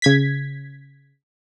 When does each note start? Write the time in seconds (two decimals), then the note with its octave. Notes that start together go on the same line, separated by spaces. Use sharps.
0.02 C#3 G#6 B6